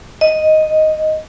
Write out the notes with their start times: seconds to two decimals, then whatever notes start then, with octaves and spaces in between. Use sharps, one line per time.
0.21 D#5